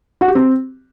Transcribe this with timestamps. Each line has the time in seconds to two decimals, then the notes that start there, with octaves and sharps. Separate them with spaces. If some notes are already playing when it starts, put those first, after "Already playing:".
0.21 F#4
0.28 G4
0.35 C4